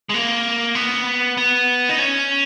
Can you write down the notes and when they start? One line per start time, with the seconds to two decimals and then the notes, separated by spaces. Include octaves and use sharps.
0.09 G#3
0.14 A#3
0.75 B3
1.37 B3
1.89 D#4
1.99 C#4